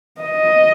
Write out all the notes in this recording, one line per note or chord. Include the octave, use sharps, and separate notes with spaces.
D#5